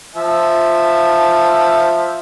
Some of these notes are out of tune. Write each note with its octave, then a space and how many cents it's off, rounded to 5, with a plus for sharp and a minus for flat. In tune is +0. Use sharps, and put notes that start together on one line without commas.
F3 +0 E5 +0 A5 +0